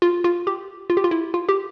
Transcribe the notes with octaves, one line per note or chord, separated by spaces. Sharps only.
F4
F4
G4
F4
G4
F4
E4
F4
G4